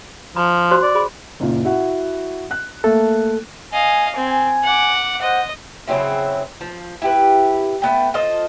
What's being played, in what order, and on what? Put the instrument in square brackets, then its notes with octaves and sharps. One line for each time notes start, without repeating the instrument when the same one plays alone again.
[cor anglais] F3 [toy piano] A#5
[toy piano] F#4 C5 C6
[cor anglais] D5
[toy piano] G#4 B5
[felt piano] F#1 A#2
E4 F#4 F#5
F#6
[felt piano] A3 A#3 [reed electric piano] A4
[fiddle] D#5 F5 [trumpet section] G#5
[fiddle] C4 [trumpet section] G#5
[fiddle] F#5 D6
[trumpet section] C5 F#5 [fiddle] D#5
[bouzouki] C#3 F#3 C4 E4
F3
E4 G4 B4
A3 B3 G5
F4 A4 C5 D#5